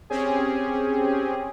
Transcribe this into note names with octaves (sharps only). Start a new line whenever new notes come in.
C4 C#4 G4 G#4